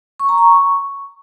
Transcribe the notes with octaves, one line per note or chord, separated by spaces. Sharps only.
C#6
A#5
C#6